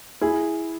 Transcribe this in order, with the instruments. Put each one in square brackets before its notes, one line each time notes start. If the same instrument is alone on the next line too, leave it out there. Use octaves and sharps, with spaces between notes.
[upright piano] E4 G#4